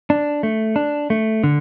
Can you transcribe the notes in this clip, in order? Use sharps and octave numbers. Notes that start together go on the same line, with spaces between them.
D4
A3
D4
A3
D3